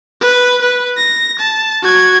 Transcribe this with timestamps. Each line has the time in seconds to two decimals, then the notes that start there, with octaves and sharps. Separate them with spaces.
0.21 B4
0.62 B4
0.97 A#6
1.39 A5
1.83 F#4 G#6